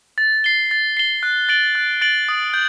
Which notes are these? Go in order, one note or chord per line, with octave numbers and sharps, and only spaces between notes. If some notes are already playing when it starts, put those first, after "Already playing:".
A6
C7 G7
A6
C7 G7
F#6
A6 D7 F#7
F#6
A6 D7 F#7
D#6
G6